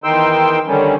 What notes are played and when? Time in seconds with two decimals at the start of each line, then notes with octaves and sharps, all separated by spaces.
0.04 E2 D#3 D#4 G5 C6 E6
0.67 D3 D#3 G3 C#4